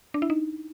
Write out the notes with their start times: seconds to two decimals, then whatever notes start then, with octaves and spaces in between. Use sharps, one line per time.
0.14 D4
0.22 E4
0.30 D#4